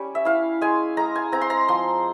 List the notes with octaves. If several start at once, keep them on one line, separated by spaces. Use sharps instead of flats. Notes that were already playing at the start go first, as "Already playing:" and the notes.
Already playing: G3 C#4 C#5
E5
E4 F5
G#3 G#5
G#3 A#5
G#5
C4 A#5
C6
A#5
F3 C6